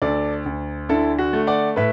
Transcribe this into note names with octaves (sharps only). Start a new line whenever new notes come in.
D2 A4 D5
D2
D3 E4 A4
F#4
A3
D5 F#5
A2 B4 E5